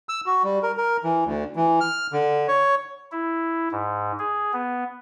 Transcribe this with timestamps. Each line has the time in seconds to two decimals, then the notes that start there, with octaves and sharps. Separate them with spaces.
0.09 E6
0.26 F#4
0.44 G3
0.63 A#4
0.77 A#4
1.04 E3
1.26 D2
1.56 E3
1.81 F6
2.13 D3
2.48 C#5
3.12 E4
3.72 G#2
4.19 G#4
4.53 B3